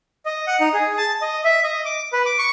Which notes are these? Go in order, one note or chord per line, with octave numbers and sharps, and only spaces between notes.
D#5
F#5
D#4
G#4
A5
D#5
E5
D#5
D6
B4
D6
C#6